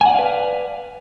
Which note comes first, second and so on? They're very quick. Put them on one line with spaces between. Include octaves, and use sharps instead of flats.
G#5 F#5 D5 F5 B4